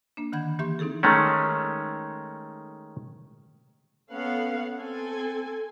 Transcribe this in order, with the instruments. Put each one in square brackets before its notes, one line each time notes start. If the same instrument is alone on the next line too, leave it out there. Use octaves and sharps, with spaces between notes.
[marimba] A#3 D4
D3 D#3 F#5 B5 G6 G#6
E3 A#3 G4 E5 C6 C#6
C4 D#4 E4 G#4 A4
[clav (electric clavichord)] D#3 G#3 A3 C#4
[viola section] B3 C#4 A4 F5 F#5
C4 A4 G#5